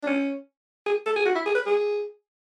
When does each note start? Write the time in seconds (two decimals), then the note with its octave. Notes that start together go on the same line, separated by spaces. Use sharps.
0.03 D4
0.06 C#4
0.86 G#4
1.06 A4
1.16 G#4
1.25 F#4
1.35 E4
1.46 G#4
1.55 B4
1.66 G#4